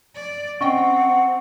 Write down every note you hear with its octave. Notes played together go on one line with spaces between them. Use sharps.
D5
C4 C#4 D#5 F#5 G5 C#6